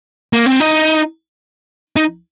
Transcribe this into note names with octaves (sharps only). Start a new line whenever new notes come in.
A#3
C4
D#4
D#4